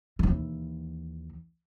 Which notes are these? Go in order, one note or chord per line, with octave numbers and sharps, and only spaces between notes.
D#2 E3